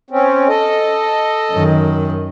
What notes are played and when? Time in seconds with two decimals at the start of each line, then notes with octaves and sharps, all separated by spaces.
0.11 C4 C#4
0.49 A4 D#5
1.52 F#2 D#3